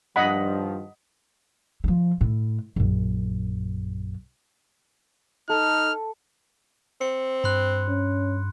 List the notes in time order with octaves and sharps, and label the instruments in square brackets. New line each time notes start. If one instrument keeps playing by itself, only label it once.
[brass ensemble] G2 D#3 F3 [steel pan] D#5 F#5 B5
[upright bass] F3 G3
A2
A#1 F#2
[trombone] D#4 [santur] A4 [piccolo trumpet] F6
[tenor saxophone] C4 [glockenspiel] C#7
[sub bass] G2 [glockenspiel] B5 C6 F#6
[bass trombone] C#4